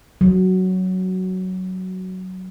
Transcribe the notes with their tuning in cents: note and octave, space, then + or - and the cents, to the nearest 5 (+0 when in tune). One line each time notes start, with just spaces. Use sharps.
F#3 +5